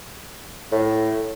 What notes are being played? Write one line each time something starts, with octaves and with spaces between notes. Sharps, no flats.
A2